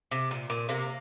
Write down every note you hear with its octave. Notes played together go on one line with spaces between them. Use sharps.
C3
A#2
A#2
C3 A#3